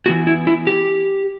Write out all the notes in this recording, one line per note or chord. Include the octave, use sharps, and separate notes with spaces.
E3 B3 E4 F#4
E4
E4
G4